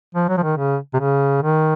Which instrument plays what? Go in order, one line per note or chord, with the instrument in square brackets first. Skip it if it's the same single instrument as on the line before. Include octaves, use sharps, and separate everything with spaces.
[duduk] F3
F#3
F3
D#3
C#3
C3
C#3
D#3